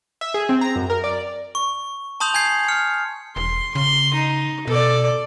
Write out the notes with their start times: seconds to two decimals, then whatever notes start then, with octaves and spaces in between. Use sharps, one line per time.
0.21 E5
0.34 G#4
0.49 C4
0.61 A#5
0.76 F#2
0.90 A#4
1.04 D5
1.55 C#6
2.20 A5 C6 D#6 G6 F7
2.34 G#5 G6 G#6 C7
2.68 F6 C#7
3.36 E1 C6
3.75 C#3 C6
4.14 D#4
4.67 B2 A4 D5